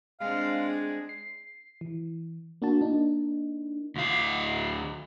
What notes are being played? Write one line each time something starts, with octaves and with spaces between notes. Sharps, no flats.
G#3 C4 D4 F5
G#4
C7
E3
A#3 D4 F#4 A5
A#3 D4 D#4
D2 F5